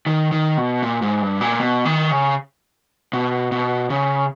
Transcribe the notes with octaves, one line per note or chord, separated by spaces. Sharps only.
D#3
D#3
B2
A#2
G#2
G2
A#2
B2
D#3
C#3
B2
B2
C#3